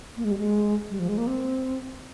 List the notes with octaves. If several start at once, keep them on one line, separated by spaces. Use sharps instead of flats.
A#3
G#3
G3
G#3
G3
F3
G#3
A#3
C4